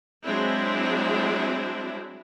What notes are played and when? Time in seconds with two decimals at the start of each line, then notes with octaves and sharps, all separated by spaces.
0.23 F#3 G#3 C4 D4 E4